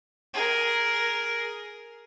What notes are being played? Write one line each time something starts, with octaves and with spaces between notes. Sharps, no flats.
G#4 A#4